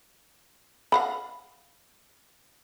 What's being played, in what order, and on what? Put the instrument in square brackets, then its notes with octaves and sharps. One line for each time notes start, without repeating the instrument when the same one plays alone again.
[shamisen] F5 F#5 B5